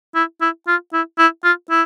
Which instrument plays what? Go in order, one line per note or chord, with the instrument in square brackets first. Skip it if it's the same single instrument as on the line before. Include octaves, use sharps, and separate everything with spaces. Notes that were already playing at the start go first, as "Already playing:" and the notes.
[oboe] E4
E4
F4
E4
E4
F4
E4